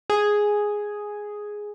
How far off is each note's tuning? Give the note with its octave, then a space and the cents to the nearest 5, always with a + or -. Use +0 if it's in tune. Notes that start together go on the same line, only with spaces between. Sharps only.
G#4 +0